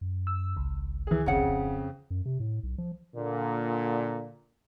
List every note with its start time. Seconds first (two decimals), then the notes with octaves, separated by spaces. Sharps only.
0.01 F#2
0.27 E6
0.56 G#1 C#2
1.07 E3 G#4
1.26 F#1 F2 C#3 C#5 F#5
1.47 D1
2.10 F#2
2.26 C3
2.40 A2
2.63 B1
2.78 F3
3.15 A#2 D3